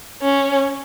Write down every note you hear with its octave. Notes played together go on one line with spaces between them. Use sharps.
C#4